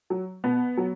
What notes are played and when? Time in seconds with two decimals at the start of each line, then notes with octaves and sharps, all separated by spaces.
0.10 F#3
0.44 B2 B3
0.77 F#3